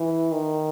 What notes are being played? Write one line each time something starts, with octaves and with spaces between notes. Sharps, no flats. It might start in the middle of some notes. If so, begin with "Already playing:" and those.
Already playing: E3
D#3